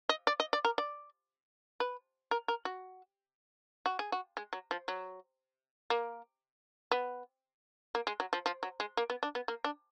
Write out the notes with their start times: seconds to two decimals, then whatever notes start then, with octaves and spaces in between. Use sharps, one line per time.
0.09 D#5
0.27 D5
0.40 D#5
0.53 D5
0.65 A#4
0.78 D5
1.80 B4
2.31 A#4
2.48 A#4
2.65 F#4
3.86 F#4
3.99 G#4
4.12 F#4
4.37 G#3
4.53 F#3
4.71 F3
4.88 F#3
5.90 A#3
6.91 B3
7.95 A#3
8.07 G#3
8.20 F#3
8.33 F3
8.46 F3
8.63 F#3
8.80 G#3
8.97 A#3
9.10 B3
9.23 D4
9.35 B3
9.48 A#3
9.64 D4